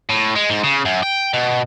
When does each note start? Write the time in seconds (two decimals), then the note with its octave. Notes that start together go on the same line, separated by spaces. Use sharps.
0.09 A2
0.35 G#3
0.50 G#2
0.64 C#3
0.85 F#2
1.03 G5
1.33 B2